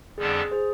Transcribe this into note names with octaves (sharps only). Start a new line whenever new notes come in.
F2 D3 G3 B3 D4 G#4
G#4 C5